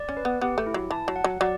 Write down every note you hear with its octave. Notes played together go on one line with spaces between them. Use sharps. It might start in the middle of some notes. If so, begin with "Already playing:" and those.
Already playing: D5
C#4
B4
B3
B3 G4
A3
E4
F#3
E3 A5
F#3
F#5
F#3
F#3 D5